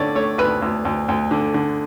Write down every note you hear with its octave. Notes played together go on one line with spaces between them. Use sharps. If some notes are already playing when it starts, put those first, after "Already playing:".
Already playing: D2 D3 A3 C#5 D5
A3 C#5
D2 B4
D2
D2
D2
D3
D3